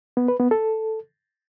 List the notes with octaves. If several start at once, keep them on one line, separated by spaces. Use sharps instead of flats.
B3
B4
B3
A4